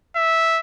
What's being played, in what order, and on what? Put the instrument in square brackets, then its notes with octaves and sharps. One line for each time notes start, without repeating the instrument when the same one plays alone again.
[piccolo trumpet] E5